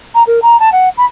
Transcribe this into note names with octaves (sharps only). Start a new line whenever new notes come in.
A#5
A#4
A#5
A5
F#5
B5